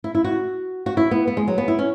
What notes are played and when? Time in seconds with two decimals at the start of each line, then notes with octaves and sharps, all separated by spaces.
0.04 E4
0.15 E4
0.25 F#4
0.86 F#4
0.97 E4
1.11 B3
1.27 B3
1.37 G#3
1.48 F#3
1.58 B3
1.68 E4
1.79 C#4